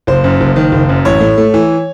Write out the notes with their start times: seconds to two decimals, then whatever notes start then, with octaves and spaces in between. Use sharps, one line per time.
0.07 F#1 C5
0.24 F#2
0.40 F#1
0.56 D#3
0.72 F#1
0.89 F#2
1.05 A1 C#5
1.21 A2
1.38 A3
1.54 E3